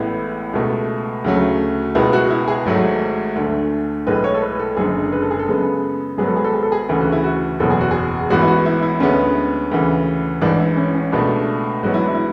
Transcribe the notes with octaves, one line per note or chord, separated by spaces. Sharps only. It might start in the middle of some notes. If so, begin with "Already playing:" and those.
Already playing: A1 A2 G#3 B3 E4
C#2 B2 A3
D2 C#3 F#3 A3
C#2 B2 G#3 B3 E4
F#4
E4
G#4
G#1 G#2 F#3 A3
D2 D3 A3
B1 A2 G#3 B4
C#5
A4
B4
A4
F#1 F#2 D3 G#3 G#4
B4
A4
G#4
A4
F#2 C#3 G#3 B3
G#1 G#2 F#3 B3 G#4
A4
G#4
A4
G#4
A4
G#4
D2 C#3 E3 A3 G#4
F#4
E4
F#4
F#1 E2 B2 F#3 A4
G#4
F#4
G#4
A1 G#2 E3 B3 F#4
E4
F#4
E4
E4
D2 D3 G#3 B3 C#4
D2 C#3 E3
A1 G#2 E3 D4
E4
C#4
C#4
C#2 B2 A3 D4
A1 G#2 F#3 B3 F#4
E4
D4
E4